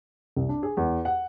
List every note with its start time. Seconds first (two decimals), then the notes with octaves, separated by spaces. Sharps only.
0.36 C2
0.49 D4
0.63 G#4
0.77 E2
1.05 F#5